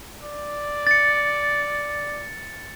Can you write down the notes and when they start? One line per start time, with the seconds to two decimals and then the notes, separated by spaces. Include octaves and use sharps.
0.23 D5
0.87 A6 C#7